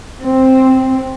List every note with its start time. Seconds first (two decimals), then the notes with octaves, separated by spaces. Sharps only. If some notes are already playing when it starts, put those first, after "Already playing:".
0.23 C4